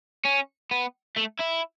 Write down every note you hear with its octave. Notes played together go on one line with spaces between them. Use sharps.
C#4
B3
A3
E4